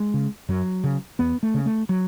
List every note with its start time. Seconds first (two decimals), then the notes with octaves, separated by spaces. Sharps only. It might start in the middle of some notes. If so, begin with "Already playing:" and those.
Already playing: G#3
0.14 C#3
0.49 F#2 F#3
0.84 C#3
1.19 E2 B3
1.43 A3
1.54 C#3
1.66 A3
1.89 F#3